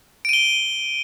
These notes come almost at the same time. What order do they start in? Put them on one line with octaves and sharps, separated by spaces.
D7 D#7 G7